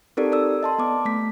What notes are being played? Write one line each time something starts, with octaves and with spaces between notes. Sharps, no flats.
C4 D#4 G4 A4 A#4 D5
A4 D5 E6
D#5 A5 C6
B3 D6
A3 B6